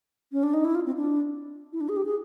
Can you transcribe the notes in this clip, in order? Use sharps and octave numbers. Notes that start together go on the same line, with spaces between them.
C#4
D4
D#4
E4
F4
C4
D4
E4
D4
G#4
G4
G#4